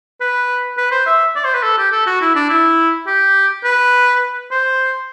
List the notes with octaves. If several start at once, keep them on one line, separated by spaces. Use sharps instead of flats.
B4
B4
C5
E5
D5
C5
B4
A4
G4
A4
F#4
E4
D4
E4
G4
B4
C5